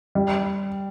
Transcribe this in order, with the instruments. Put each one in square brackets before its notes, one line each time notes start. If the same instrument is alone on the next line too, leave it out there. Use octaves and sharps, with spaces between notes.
[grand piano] G3